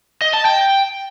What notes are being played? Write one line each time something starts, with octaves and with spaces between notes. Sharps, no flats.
D#5
A5
G5